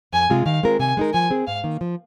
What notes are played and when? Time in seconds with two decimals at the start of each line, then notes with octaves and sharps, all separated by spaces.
0.13 F2 G#5
0.30 C3 G#3 F4 G#4
0.46 D#3 F5
0.63 G#3 C4 F4 A#4
0.79 C3 G#5
0.97 G#3 D#4 A#4
1.13 F3 G#5
1.30 C4 G#4
1.47 G#2 F5
1.64 D#3 A#3
1.81 F3